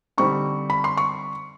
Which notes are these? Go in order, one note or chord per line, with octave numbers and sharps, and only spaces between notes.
D3 G3 C4 D#4 C#6
B5
C6
C#6